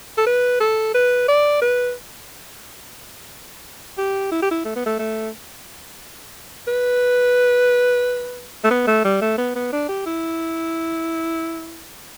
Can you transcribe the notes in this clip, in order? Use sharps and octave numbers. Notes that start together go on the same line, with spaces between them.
A4
B4
A4
B4
D5
B4
G4
E4
G4
E4
A3
B3
A3
A3
B4
A3
B3
A3
G3
A3
B3
B3
D4
G4
E4